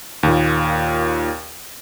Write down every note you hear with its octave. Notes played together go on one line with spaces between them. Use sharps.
D#2 A#2